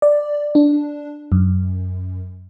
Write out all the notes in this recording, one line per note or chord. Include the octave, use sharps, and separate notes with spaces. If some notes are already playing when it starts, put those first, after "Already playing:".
D5
D4
F#2